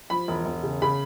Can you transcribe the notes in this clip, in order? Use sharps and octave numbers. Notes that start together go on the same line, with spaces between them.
F3 B5
E1
E1
C#3
C#3 B5